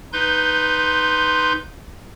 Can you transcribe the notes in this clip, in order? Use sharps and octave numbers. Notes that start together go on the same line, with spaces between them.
D#4 B4 C6 G6